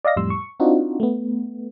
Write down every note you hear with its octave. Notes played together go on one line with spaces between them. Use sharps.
D5 D#5 F5 A#6
F2 A2 G3 C6 E6
C#6
C4 D4 D#4 F4 F#4
A3 B3